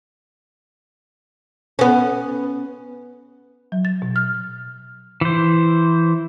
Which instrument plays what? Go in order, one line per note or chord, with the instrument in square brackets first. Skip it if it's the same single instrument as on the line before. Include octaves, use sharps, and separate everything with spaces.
[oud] B3 C#4
[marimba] F#3
A6
B2
F6
[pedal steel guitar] E3 C5